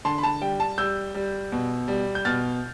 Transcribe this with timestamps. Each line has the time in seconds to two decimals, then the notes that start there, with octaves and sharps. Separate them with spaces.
0.05 D3 A5 C6
0.18 B5
0.23 A5
0.41 G3 G5
0.60 A5
0.78 G3 E6 G6
1.15 G3
1.52 B2
1.88 G3
2.15 G6
2.25 B2 F6 A6